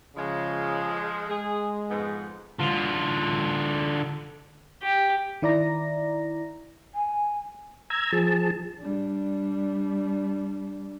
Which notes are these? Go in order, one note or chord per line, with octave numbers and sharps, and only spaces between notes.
C#3 F3 G#3
G#3 G#4
F2 G#2 B3
D3 F4
G4
D#3 E4 D5 A#5 A#6
G#5
A#5 E6 G#6
F3 G#4 A5
G3 D4